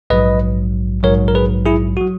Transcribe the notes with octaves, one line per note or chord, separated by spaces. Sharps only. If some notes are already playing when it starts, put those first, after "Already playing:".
A#1 G#2 F#3 B4 D#5
A#1 G#2 F#3 A#4 C#5
A#4
G#4 B4
E4 G#4
F#3 F#4